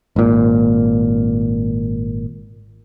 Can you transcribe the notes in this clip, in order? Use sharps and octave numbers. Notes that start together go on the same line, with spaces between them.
G#1 A#2